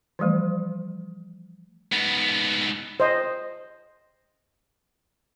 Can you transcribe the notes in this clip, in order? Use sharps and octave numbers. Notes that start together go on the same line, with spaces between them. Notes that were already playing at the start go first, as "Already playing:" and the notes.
E3 F3 G3 A3
G#2 B3
C5 D#5